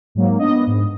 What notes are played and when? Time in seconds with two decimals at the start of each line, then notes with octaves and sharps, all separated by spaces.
0.15 G#2 F#3 A#3
0.39 B3 D4 D#5
0.67 G#2